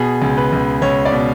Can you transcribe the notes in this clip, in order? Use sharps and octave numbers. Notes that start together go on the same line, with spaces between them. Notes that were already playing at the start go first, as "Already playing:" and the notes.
Already playing: B2 G#4
C#2
B4
C#2
C#2 C#5
D5
B2